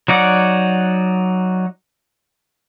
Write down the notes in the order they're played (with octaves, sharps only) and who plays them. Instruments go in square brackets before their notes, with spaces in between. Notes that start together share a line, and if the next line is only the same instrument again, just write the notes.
[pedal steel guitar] F#3 D#4 D5 F#5